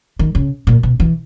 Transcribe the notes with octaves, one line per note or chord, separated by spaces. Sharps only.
D#3
C#3
A#2
B2
E3